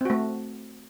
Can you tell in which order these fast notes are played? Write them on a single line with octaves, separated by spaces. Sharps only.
C4 F#4 A3